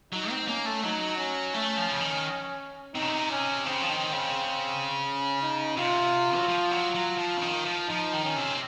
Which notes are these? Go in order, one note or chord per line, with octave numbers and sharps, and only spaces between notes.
F#3 D#4
C4
A#3 C#4
A3
F#3 D#4
C#4
A3
F3
C#3
D#3
C3 D#4
C#3
C3
C#4
C#3 C4
F3
D#3
C#3
C#4
D#4
C3 F4
F#3
F3
F#3
F#3
F3
C#3
D#3
F3
F3 D#4
D#3
C#4
C3